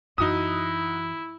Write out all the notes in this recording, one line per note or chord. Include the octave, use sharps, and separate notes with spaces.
F#2 E3 D#4 E4 F#4 D#6